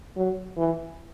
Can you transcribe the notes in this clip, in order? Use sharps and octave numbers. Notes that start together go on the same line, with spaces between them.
F#3
E3